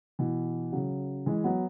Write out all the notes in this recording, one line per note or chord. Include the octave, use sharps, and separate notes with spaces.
B2 E3
C#3 F#3
E3 G#3
F#3 B3